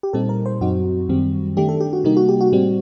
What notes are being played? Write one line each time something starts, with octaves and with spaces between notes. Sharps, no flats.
G4
A#2 G3 C4 D#4 A4
A#4
C5
F#2 F#3 C4 D#4 F#4
F#2 D#3 G3 C4
D#3 A3 D4 G4
A4
G4
F#4
C3 G3 A#3 D#4 G4
F#4
G4
F#4
A2 G3 C4